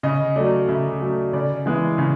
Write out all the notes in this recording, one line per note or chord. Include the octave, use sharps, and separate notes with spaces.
C#3 D#5
F#3 A3 D5
C#3 E5
F#3 A3
C#3 D5
E3 G#3 B3
C#3